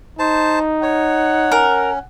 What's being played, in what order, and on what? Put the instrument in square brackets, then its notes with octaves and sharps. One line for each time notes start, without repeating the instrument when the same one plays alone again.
[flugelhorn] D#4 [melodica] C5 A5
[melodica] C#5 [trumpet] F#5
[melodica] C#4 [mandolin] A#4